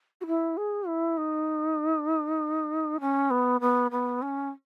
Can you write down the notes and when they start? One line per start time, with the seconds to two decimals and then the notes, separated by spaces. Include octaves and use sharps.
0.21 F#4
0.26 E4
0.57 G#4
0.87 E4
1.18 D#4
3.01 C#4
3.30 B3
3.61 B3
3.91 B3
4.22 C#4